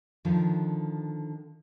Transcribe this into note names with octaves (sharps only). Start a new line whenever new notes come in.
D3 D#3 F3